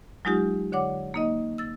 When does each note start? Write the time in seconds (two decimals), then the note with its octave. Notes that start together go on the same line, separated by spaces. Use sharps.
0.25 F#3 G#3 D#4 F4 G4
0.72 D3 C#5 F#5 D6
1.14 A#3 D#4 D#5
1.58 E6 A6